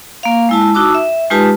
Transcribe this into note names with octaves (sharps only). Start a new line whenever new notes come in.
A#3 F5
G#3 E4 A5
D#4 F#4 A5 D6 E6
E5
G#3 D#4 F4 G4 B4 A5